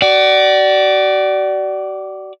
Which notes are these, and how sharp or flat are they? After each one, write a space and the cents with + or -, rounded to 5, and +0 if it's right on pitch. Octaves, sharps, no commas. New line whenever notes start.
F#4 +40 D5 +0